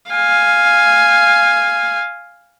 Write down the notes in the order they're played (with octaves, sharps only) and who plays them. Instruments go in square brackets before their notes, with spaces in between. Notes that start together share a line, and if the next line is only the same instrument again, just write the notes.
[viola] F5 G#5